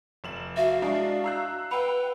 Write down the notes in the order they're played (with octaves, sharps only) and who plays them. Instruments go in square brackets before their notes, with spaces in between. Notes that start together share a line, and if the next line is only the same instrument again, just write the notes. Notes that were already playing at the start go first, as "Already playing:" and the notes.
[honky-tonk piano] F1 E7 F#7
[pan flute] F#4 [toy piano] E5 [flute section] F5
[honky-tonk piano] G#3 D4 D#5 [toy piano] E4 G#5
[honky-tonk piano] A#5 E6 F#6
[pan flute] B4 [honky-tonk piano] F#5 G5 [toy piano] B5